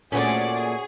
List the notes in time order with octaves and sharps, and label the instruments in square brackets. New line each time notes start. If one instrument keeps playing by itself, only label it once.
[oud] A#2 A3 [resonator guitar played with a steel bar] C#4 F#4 [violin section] G#4 C5 D5
[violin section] G#4